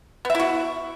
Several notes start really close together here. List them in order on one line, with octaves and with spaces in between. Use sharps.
B3 E5 E4 F#4